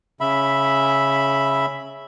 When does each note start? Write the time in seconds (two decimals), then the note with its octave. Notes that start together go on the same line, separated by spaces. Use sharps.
0.20 C#3 E5 B5